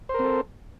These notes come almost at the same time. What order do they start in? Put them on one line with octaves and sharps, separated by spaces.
C5 A#4 C4 A4